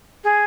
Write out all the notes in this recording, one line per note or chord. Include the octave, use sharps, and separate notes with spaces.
G#4